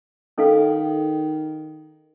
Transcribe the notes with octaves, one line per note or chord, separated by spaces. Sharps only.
D#3 C#4 A4 F5